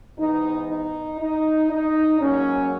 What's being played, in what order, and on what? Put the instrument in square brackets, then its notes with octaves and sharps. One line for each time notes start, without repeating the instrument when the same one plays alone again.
[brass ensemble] G#2 E3 B3 D#4
D#4
D#4
D#4
G#2 F#3 A#3 C#4